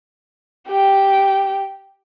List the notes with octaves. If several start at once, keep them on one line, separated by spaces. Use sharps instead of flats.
G4 G5